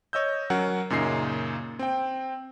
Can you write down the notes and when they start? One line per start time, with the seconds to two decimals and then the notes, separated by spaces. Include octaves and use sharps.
0.13 C#5 D#5 E6 G6
0.50 F#3 C#4 A#4 F#5
0.90 F#2 A#2 C#3 D#4 C7
1.79 C4 G5